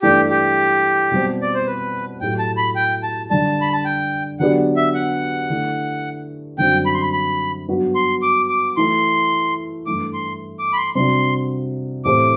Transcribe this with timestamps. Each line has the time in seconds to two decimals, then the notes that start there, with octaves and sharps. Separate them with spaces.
0.02 G2 E3 A3 D4 G4 A4
0.30 G4
1.11 B2 G3 C4
1.42 D5
1.54 C5
1.67 B4
2.21 A2 F#3 A3 E4 G4 G5
2.39 A5
2.57 B5
2.76 G5
3.03 A5
3.30 D3 G3 D4 A5
3.61 B5
3.73 A5
3.85 G5
4.40 D3 F#3 B3 D4 G4 F#5
4.76 E5
4.94 F#5
5.49 D3 A3 E4
6.58 F#2 D3 G3 C4 F#4 G5
6.86 B5
6.94 C6
7.02 B5
7.13 B5
7.68 G2 F#3 B3 F#4
7.95 C6
8.22 D6
8.50 D6
8.77 E3 A3 E4 C6
9.86 G2 E3 A3 D6
10.14 C6
10.59 D6
10.73 B5
10.77 C6
10.95 C3 G3 D4 F#4 C6
12.05 A2 E3 A3 C4 G4 D6